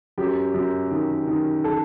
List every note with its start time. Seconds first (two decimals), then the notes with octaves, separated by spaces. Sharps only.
0.18 F#2 G4
0.54 F#2
0.91 D#3
1.28 D#3
1.64 A4